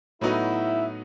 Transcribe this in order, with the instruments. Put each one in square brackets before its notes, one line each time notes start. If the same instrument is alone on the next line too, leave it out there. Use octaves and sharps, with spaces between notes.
[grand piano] A2 F#3 B3 D#4 F#4 [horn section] E4